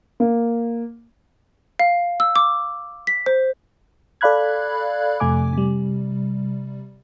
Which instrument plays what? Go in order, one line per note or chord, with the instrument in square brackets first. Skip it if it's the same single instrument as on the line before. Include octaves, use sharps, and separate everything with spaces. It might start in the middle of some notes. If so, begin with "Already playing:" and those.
[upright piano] A#3
[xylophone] F5
E6
D6
B6
C5
[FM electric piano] A4 D5 F5 B5 F#6 G#6
F2 C3 A3 G#5 D6
C3 G3